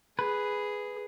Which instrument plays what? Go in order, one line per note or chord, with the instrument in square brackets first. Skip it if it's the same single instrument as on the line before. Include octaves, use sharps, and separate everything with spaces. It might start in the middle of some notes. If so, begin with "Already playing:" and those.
[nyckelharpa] G#4 [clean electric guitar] B4